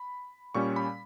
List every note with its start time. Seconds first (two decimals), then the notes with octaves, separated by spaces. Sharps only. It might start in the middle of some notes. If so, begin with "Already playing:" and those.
Already playing: B5
0.54 A#2 G3 C#4 C#6
0.76 B5